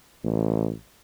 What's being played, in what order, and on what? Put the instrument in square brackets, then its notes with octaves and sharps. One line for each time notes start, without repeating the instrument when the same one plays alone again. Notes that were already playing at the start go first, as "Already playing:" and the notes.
[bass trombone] A1